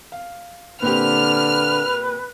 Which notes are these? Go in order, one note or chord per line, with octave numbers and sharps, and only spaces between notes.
F5
A#2 D3 C4 G4 B4 F6